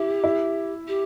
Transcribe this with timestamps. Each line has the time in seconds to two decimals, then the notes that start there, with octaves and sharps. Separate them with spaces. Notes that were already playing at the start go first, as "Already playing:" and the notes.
Already playing: E4 G4
0.24 E4
0.87 G4